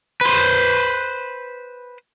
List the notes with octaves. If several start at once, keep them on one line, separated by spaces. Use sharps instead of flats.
B4 C5